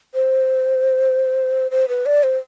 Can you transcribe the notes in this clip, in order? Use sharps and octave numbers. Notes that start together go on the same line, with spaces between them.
C5
C5
B4
D5
C5